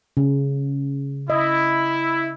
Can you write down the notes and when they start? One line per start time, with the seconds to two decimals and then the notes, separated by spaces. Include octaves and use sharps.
0.17 C#3
1.30 E4 D#5